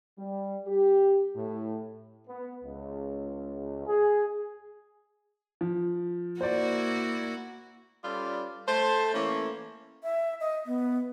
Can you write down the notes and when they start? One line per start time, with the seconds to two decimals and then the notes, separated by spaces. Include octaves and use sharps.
0.18 G3
0.67 G4
1.35 A2
2.28 B3
2.63 C#2
3.87 G#4
5.61 F3
6.41 A#3 E4 F#4 C5 D5
8.04 G3 C#4 F4 A4 B4 D5
8.68 A3 C5 A5
9.14 E3 A3 A#3 C#4 C#5
10.03 E5
10.41 D#5
10.66 B3